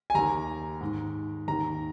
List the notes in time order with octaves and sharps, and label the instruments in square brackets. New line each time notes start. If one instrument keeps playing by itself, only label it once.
[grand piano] G#5
D#2 D#3 A#5
G#2 D#3
D#2 D#3 A#5